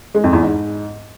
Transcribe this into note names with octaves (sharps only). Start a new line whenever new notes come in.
G#3
F2
E2
G#2